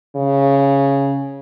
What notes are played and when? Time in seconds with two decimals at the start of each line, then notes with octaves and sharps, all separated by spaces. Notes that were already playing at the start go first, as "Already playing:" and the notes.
0.16 C#3